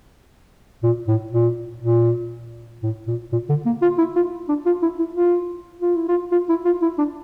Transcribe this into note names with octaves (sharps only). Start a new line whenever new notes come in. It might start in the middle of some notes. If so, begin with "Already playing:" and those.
A#2
A2
A#2
A#2
A2
A#2
A#2
D3
A#3
F4
E4
F4
D4
F4
E4
E4
F4
F4
E4
F4
F4
E4
F4
E4
D4